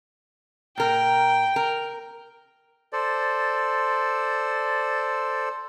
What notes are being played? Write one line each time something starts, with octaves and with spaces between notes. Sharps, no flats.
A#2 A#4 G5
A#4
A4 C5 D5